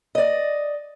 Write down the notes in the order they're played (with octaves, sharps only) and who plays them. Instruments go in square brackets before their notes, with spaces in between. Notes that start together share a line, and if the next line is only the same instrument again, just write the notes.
[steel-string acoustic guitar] D5 D#5